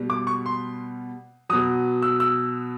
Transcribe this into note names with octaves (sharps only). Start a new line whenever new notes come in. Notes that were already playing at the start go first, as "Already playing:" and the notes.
Already playing: B2 G3
D6
C#6
C6
B2 F#3 D#6
E6
E6